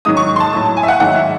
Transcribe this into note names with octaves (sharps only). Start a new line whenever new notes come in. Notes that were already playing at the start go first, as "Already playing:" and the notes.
G#2 D#3 F#3 D#6
C#6
C6
A5
A2 F#3 A5
A5
G#5
E5
F#5
G#2 D#3 F#3 F#5
E5